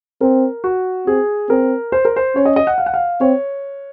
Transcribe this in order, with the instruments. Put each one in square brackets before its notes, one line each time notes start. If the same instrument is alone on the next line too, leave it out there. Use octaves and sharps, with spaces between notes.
[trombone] C4 [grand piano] A#4
[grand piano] F#4
[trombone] C4 [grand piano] G#4
[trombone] C4 [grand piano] A#4
[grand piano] C5
A#4
C5
[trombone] C#4 [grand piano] C#5
[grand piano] D#5
D#5
F#5
F5
F#5
F5
[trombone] C4 [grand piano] C#5